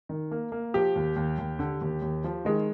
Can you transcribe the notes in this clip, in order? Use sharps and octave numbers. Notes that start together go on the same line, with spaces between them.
D#3
A#3
A#3
F3 G4
D#2
D#2
D#2
D3
D#2
D#2
F3
D#3 G#3